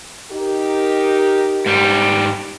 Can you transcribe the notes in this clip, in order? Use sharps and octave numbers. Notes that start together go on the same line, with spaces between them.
D#4 G4 A#4
G#2 G3